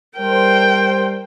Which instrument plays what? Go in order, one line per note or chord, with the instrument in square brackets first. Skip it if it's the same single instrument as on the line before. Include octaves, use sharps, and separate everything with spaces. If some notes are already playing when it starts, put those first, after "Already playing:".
[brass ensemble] G3 C5 [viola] A#4 G5